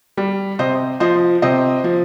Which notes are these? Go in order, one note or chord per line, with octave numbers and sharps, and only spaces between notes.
G3
C3 C5 D#5
F3 C5 D#5
C3 C5 D#5
F3